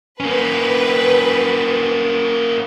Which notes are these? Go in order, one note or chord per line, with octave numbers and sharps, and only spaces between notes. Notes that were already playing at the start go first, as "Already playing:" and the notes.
A#3 C#4 B4